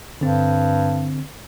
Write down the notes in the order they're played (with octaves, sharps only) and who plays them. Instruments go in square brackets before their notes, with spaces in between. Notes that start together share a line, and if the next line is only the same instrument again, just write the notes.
[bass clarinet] G2 [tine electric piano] D3 C4